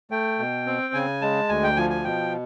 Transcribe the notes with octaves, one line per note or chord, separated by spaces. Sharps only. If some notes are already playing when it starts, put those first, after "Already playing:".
A3 G5
B2
C4
C#3 G#5
G#3 A5
D2 G#5
G5
F3 G#5
G#5
B2 G5